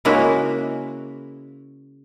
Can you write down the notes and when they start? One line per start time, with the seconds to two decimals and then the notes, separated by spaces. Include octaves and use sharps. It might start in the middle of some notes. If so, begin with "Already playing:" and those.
0.05 C#3 G#3 A#3 E4 F#4